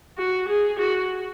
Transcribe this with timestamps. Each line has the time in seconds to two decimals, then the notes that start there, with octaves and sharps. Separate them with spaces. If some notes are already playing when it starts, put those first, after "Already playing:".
0.18 F#4
0.49 G#4
0.79 F#4